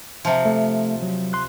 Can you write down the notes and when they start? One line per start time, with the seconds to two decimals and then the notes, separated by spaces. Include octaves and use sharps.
0.25 C3 F3
0.46 A3
1.02 F#3
1.33 C6 F#6